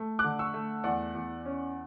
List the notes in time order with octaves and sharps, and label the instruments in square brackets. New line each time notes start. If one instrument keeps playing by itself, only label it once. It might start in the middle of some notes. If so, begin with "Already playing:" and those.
Already playing: [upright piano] A3
D6 F#6
D3
C#6 E6
A3
E2 D5 F#5
E2
C#4